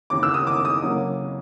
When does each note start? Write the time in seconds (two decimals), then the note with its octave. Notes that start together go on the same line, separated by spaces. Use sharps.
0.10 D#2 C#3 E3 D6
0.23 E6
0.34 D#6
0.47 D6
0.65 D#6
0.82 C#3 F#3 A#3